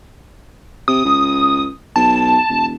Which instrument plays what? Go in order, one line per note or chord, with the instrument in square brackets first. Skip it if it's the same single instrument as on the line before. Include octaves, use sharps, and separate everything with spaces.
[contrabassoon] C3 [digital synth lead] D#6
[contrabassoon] C#2
[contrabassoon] B1 [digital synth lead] A5
[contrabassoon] E1